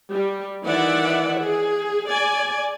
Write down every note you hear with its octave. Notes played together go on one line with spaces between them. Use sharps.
G3
D#3 E3 D5 E5 F#5
G#4
D5 G#5